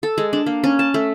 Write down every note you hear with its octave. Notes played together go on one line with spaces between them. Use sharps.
A4
G#3
D4
A#3
C#4
A5
A3